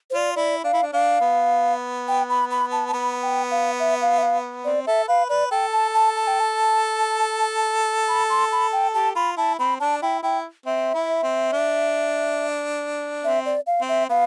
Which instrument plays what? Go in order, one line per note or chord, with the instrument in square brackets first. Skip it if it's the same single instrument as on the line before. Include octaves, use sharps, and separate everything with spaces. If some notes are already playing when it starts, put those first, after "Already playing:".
[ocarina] C5
[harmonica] F4 [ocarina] D5
[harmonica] E4 [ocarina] D5
[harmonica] D4 [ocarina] F5
[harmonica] E4
D4
[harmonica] D4 [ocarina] F5
[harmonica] B3
[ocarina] G5
B5
B5
A5
A5
[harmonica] B3 [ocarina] B5
[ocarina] G5
F5
E5
F5
E5
F5
[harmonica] C4 [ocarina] D5
[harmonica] A4 [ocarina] E5
[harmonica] B4 [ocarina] F5
[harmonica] B4 [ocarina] D5
[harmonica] A4 [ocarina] G5
[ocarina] A5
A5
A5
G5
A5
B5
C6
B5
G5
[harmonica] G4 [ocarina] A5
[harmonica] F4 [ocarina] B5
[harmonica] E4 [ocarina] A5
[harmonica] C4 [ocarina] B5
[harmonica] D4 [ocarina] A5
[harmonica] E4 [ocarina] G5
[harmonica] E4 [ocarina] G5
[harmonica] C4 [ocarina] E5
[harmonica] E4
C4
D4
[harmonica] C4 [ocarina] E5
[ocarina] D5
F5
[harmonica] C4
[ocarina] E5
[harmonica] B3 [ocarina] F5